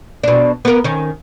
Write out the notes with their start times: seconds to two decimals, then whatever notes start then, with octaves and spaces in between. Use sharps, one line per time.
0.24 B2 D4
0.65 B3 A#4
0.84 D#3 C#4